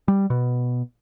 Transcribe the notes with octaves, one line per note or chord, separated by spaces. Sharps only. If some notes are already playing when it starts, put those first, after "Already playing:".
G3
B2